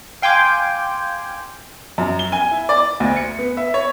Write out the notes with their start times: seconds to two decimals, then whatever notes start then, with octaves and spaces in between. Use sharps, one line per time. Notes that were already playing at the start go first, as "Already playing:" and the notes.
0.22 F5 G5 G#5 C6 D6 G6
1.98 F#2
2.19 G7
2.32 G#5
2.51 E4
2.69 D5
3.00 D2
3.17 C#7
3.39 B3
3.57 E5
3.74 C#5